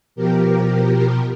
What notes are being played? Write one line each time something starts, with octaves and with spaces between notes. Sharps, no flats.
B2 F3 G4 A#4